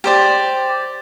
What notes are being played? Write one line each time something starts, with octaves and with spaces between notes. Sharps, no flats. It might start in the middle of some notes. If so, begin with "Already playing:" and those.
G4 C5 D5